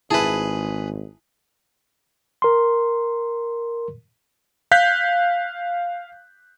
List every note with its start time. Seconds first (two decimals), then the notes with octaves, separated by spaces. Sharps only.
0.11 G#1 E4 G#4 B4 A5
2.42 A#4 C6
4.71 F5 F#6 G6 B6